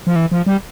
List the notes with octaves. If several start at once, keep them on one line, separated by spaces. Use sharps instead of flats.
F3
E3
F3
G3